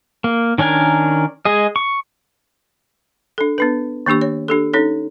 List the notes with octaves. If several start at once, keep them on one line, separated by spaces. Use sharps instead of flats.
A#3
D#3 C#4 D4 A#4 G#5
G#3 G#4 D#5
C#6
D4 A4
B3 D4 B4
D#3 A#3 D4 G4 C#6
C#5
D4 G4 A4
C#4 D#4 A4 C#5